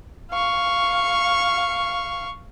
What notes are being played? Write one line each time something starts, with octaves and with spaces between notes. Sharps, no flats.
F5 C#6